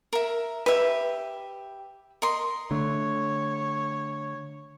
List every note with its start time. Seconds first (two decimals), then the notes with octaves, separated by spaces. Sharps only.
0.13 A#4 E5
0.66 G4 B4 E5 B5
2.22 A#4 D#5 C6
2.71 D3 A3 C#5